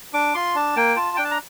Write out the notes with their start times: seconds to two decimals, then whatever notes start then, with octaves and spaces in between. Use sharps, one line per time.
0.14 D4 D6
0.35 F4 C6
0.55 D4 A5
0.76 A#3 G5
0.96 F4 A5
1.16 D4 G5
1.24 A5
1.31 A#5